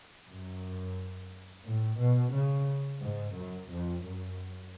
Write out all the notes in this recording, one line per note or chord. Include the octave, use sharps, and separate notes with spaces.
F#2
A2
B2
C#3
G#2
F#2
F2
F#2